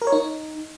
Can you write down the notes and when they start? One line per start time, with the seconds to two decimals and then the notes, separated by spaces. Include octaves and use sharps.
0.02 A#4
0.07 C#5
0.12 D#4